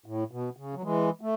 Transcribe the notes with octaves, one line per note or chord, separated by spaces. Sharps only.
A2
B2
C#3
F#3
E3 G#3
A3